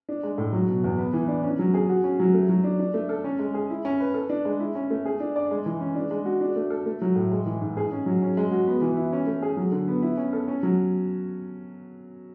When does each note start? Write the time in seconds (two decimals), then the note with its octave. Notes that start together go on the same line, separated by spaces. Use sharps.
0.09 D4
0.23 G#3
0.38 A2
0.53 F#3
0.68 B2
0.84 E2
0.98 B3
1.13 E3
1.28 D4
1.43 C#4
1.59 F#3
1.74 G#4
1.89 F#4
2.04 C#4
2.20 F#3
2.34 A3
2.49 F#3
2.64 D4
2.79 D4
2.94 A3
3.09 A4
3.24 C#4
3.39 G#3
3.54 G#4
3.70 E4
3.85 C#4
4.00 B4
4.14 A4
4.29 D4
4.45 G#3
4.60 E4
4.75 C#4
4.90 A3
5.05 G#4
5.20 D4
5.36 D5
5.51 G#3
5.66 E3
5.81 C#4
5.95 D4
6.11 G#3
6.25 F#4
6.41 D4
6.56 A3
6.70 A4
6.86 A3
7.02 F#3
7.16 A2
7.32 G#3
7.46 E3
7.61 G#2
7.77 G#4
7.92 C#4
8.06 F#3
8.22 C#4
8.37 G#3
8.51 F#4
8.67 B3
8.82 E3
8.97 E4
9.13 C#4
9.27 A3
9.42 G#4
9.57 F#3
9.72 D3
9.88 B3
10.02 E4
10.17 C#4
10.33 A4
10.48 C#4
10.63 F#3